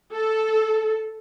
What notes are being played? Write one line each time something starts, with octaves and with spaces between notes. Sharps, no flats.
A4